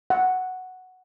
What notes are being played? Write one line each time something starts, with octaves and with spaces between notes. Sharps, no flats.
F#5